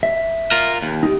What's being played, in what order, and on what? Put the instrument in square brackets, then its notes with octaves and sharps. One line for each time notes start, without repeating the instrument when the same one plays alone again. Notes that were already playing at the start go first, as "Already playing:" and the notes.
[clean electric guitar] E5
[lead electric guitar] F4 A#4
D#2
[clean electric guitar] D#4 G4